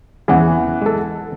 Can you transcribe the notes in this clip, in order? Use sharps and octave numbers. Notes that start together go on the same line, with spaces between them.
E2 E3 C#4 G#4 F#5
G#3 A4